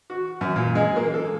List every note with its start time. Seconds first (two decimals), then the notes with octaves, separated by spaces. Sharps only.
0.10 F#4
0.41 F#2
0.56 A#2
0.75 G#3
0.96 A#3
1.14 A4